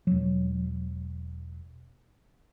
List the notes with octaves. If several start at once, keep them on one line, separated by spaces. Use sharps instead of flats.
E1 F#3